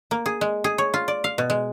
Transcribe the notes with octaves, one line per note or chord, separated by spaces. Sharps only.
A#3
G#4
G#3
G#4
C#5
F4
D5
F5
B2
G#3